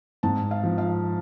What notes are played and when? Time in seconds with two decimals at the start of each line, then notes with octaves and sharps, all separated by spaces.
0.23 G#2 A5
0.51 F5
0.63 F3
0.78 F5